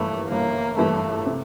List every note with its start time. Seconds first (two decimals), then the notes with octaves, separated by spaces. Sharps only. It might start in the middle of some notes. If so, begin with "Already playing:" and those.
Already playing: G1 G2 E3 A3 A#3 E4
0.31 G1 A#3
0.78 G2 E3 A3 A#3 E4
1.26 C3